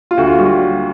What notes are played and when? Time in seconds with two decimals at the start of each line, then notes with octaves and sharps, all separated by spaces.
0.11 F4
0.17 D2 F#4
0.27 F4
0.38 G3 F#4